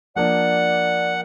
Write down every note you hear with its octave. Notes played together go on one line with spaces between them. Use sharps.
F3 A#3 D4 D5 F#5